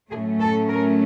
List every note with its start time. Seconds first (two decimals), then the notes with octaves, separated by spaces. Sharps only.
0.10 A2 F#3 A3 C#4 G#4
0.40 A4
0.68 A#4